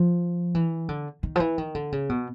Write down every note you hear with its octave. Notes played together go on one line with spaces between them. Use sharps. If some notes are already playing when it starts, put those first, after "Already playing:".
Already playing: F3
E3
D3
D#3
F3
E3
D#3
D3
C#3
B2